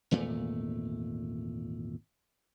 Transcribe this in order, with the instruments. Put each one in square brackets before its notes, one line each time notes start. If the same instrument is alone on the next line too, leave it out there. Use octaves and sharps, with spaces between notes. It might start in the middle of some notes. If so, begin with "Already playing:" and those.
[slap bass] G#1 E2 A#2 A3